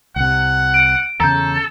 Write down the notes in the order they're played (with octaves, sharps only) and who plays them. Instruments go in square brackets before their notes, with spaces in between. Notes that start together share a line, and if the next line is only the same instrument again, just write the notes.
[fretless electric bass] C2 C3 [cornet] F#5
[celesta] D7
[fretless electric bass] E2 C#3 [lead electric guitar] A4 [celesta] A#5 G6